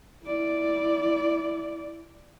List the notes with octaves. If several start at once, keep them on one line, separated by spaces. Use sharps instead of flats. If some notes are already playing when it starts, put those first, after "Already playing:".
E4 D5